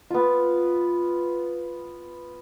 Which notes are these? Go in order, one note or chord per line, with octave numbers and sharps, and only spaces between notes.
B3 F4